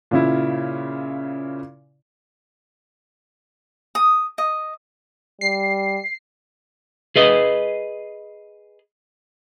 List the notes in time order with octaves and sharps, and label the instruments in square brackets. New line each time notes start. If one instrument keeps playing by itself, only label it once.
[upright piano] A#2 C#3 E4
[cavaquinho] D#6
D#5
[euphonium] G3 [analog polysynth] C7
[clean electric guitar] G#4 B4 D#5